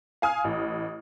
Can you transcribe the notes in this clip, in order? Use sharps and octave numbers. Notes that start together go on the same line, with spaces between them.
F5 G#5 D#6 F6
A1